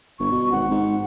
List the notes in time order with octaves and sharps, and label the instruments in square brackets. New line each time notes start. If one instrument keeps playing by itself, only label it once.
[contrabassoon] G1 [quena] C#6
[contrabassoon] B2
[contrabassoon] G#1 [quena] F#5
[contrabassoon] G#2